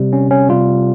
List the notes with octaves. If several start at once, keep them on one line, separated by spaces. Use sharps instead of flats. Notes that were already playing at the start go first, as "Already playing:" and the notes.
Already playing: C3 G3
C#4
C#4
C3 G3 F4